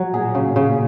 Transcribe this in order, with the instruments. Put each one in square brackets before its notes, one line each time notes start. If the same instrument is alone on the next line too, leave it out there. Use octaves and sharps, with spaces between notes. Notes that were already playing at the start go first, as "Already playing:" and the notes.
Already playing: [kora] F#3
[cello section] A#2 [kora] G#4
[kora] C#3
[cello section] A#2
[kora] C#3